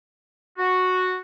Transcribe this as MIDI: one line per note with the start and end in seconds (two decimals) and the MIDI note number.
0.58 1.18 66